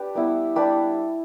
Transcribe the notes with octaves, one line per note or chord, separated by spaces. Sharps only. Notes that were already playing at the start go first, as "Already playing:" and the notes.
Already playing: D4 G4 B4
G3 B3 E4
G3 D4 G4 B4